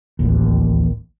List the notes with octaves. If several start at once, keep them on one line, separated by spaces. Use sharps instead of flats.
D1 A1 D#2